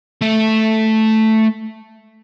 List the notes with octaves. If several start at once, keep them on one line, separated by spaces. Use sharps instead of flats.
A3 E5